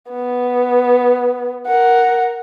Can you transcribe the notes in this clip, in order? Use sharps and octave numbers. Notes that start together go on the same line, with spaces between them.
B3
A#4 F#5